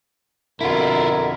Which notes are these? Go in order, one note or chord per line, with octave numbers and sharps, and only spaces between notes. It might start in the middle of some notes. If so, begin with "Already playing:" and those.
F2 B2 D3 E4 F4 A#4